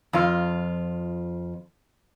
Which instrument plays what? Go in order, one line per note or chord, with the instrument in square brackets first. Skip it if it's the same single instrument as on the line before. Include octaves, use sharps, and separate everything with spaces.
[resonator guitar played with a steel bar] F2 F4